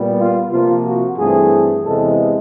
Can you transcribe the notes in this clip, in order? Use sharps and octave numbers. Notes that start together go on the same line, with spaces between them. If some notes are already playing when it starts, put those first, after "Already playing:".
Already playing: A#2 G3 B3
F4
C3 F3 A#3 F4
F#4
G2 E3 A3 C4 G#4
E2 C3 E3 G#3 B3 A4